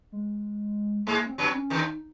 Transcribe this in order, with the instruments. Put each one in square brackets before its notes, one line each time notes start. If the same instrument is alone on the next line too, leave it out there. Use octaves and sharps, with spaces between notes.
[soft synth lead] G#3
[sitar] G#2 G#3 [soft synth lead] A#3
[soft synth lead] C#4
C4
[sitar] F#2 F#3
[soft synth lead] C#4
[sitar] D#2 D#3
[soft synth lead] D#4